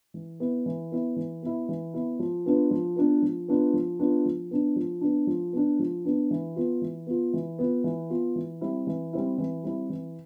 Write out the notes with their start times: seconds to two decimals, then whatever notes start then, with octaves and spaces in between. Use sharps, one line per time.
0.14 E3
0.40 B3 E4
0.66 E3
0.92 B3 E4
1.16 E3
1.42 B3 E4
1.69 E3
1.94 B3 E4
2.19 F3
2.46 B3 D4 F4 B4
2.71 F3
2.96 B3 D4 F4 B4
3.22 F3
3.48 B3 D4 F4 B4
3.74 F3
3.99 B3 D4 F4 B4
4.25 F3
4.51 B3 D4
4.76 F3
5.01 B3 D4
5.27 F3
5.53 B3 D4
5.79 F3
6.05 B3 D4
6.31 E3
6.56 B3 F4
6.82 E3
7.07 B3 F4
7.33 E3
7.59 B3 F4
7.84 E3
8.10 B3 F4
8.35 E3
8.61 G3 C4 E4
8.87 E3
9.13 G3 C4 E4
9.38 E3
9.63 G3 C4 E4
9.90 E3